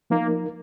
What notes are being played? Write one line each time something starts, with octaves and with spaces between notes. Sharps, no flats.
F3 A#3 D#4 A#4